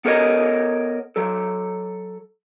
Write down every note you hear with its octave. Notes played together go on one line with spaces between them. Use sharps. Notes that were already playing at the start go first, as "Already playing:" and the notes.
B3 A4 A#4 C#5 D#5
F#3 A4